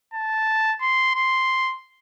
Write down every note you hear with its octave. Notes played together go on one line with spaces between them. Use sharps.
A5
C6
C6